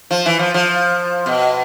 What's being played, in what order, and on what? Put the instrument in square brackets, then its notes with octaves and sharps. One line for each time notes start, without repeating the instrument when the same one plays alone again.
[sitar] F3
E3
F3
F3
B2